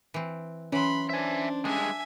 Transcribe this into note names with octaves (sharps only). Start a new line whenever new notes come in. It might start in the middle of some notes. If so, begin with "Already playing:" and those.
E3 C4
E3 F#3 C#4 B5 C6
D4 C5 E5 G#5
G2 G#3 D4 E5 G#5